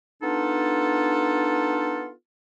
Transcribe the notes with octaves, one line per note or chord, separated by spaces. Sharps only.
B3 D4 D#4 F4 A4